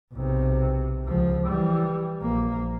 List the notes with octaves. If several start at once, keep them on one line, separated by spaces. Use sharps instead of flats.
B1 C3
C#2 F3
E3 G3
A#1 A#3